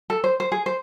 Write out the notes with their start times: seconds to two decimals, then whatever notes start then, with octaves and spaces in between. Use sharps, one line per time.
0.10 A4
0.24 C5
0.40 C5
0.52 G#4
0.66 C5